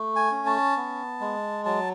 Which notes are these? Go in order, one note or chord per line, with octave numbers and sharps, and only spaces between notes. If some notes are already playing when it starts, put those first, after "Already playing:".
Already playing: A3
G#5
C#4
A5
B3
G#3
F#3 A5